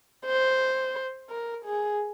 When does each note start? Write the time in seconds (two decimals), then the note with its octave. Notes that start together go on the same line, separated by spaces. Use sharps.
0.26 C5
1.30 A#4
1.65 G#4